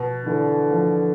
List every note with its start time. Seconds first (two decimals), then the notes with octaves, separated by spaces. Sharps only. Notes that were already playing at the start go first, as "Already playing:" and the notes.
Already playing: B2
0.25 D3 E3
0.71 F3